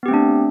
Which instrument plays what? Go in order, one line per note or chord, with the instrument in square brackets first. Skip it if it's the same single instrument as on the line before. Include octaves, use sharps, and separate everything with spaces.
[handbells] B3
G4
C4
A3
D4